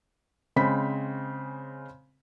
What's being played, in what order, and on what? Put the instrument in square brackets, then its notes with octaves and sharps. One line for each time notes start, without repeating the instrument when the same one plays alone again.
[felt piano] C#3 G#3 C4 B5 B6